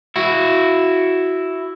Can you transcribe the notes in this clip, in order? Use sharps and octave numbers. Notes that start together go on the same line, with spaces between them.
E4 F#4